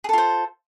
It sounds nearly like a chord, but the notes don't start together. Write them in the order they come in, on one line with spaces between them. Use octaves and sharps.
G#4 A4 F4 C5